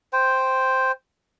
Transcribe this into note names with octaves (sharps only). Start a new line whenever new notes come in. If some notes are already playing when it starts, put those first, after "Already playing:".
C5 G5